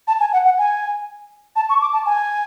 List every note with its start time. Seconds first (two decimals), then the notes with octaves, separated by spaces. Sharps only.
0.08 A5
0.20 G#5
0.33 F#5
0.45 F#5
0.58 G#5
1.56 A5
1.69 C#6
1.81 D6
1.93 A5
2.06 G#5